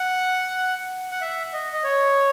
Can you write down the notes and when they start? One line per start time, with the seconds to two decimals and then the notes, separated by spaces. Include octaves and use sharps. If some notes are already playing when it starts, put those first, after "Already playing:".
Already playing: F#5
1.11 F#5
1.21 E5
1.53 D#5
1.73 D#5
1.84 C#5